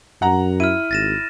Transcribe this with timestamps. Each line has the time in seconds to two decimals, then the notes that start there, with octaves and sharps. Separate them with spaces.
0.22 F#2 F#5 A#5
0.60 E4 F6 D#7
0.91 G#1 A6 A#6 E7